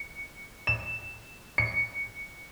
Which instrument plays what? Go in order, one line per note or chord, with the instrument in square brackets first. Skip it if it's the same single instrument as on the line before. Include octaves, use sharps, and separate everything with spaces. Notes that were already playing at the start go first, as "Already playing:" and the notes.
Already playing: [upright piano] C#7
E7
C#7